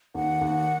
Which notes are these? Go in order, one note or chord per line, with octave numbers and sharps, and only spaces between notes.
D#2 F#5
D#2